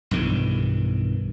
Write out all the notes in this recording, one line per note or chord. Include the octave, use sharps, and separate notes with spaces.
B1 G2 D#3 E3